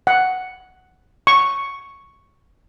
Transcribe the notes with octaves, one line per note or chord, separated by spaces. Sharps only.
F#5
C#6